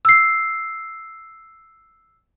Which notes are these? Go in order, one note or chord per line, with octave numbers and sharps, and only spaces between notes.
E6 C7